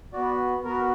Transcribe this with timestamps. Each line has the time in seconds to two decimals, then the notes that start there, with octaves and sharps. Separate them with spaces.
0.13 B3 F#4 D5
0.64 B3 F#4 A#4